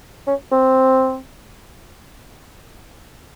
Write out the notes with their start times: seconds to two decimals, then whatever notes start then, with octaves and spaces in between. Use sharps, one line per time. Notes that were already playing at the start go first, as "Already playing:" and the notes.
0.27 C#4
0.51 C4